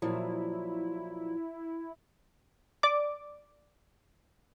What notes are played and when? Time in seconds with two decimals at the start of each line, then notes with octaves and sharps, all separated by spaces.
0.02 A#2 F3 F#3 E4
2.83 D5 D6